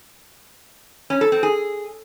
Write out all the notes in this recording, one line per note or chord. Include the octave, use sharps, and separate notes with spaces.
C#4
A4
C4
G#4